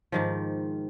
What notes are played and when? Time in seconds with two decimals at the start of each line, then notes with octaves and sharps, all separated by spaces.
0.12 G#2 D#3 F3